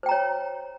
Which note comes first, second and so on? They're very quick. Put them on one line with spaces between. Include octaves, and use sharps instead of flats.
C5 G5 A#5 C#5